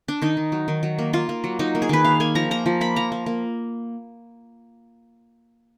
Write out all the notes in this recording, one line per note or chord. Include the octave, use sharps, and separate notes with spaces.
D4
D#3 D#4
D#3
F#3
D#3
F#3
A#3
A#3 F4
A#3
F#3
F#3 D#4
A#3
G#4
D#3 B4
A#3 F5
A#3 G#5
F3 A#5
A#3 A#5
F3
A#3 B5
F3 A#5
A#3
A#3